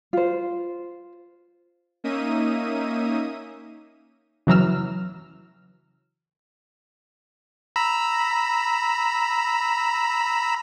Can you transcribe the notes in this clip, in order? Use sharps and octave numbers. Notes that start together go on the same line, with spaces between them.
F4 C5
A#3 C#4 D#4 E5 D#6 D#7
C#3 E3 F#3 A#5 E6 F6
A#5 B5 E6